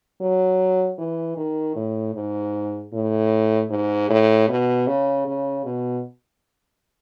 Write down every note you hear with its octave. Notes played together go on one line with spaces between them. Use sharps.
F#3
E3
D#3
A2
G#2
A2
G#2
A2
B2
C#3
C#3
B2